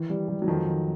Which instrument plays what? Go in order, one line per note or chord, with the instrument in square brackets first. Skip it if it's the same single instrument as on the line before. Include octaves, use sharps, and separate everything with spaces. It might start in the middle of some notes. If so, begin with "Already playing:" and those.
Already playing: [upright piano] D#3 [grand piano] E3
[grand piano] G3
G3
[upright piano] F#3
[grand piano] F2 [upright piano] D#3 F3
[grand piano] D#3